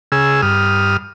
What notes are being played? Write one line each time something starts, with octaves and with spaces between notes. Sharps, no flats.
C#3 G#4 E6
G2 D#6 F6